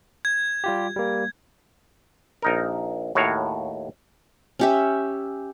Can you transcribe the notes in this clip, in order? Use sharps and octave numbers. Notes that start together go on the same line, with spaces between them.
G#6
G3 F4 G4
G3 A#3
A#1 D#4 A#4
D#2 A2 F#4 C#5 F5
C#4 G4 E5